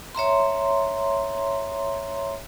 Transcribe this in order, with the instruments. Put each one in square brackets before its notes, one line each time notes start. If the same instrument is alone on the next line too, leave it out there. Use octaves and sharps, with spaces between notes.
[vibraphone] C#5 E5 A#5 C6